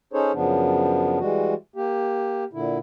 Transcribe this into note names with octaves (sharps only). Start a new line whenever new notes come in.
C#4 D#4 G#4 A4 C5 C#5
F#2 C#3 F3 B3 D4
E3 G3 G#3 F#4
A#3 G4
A#2 D3 E4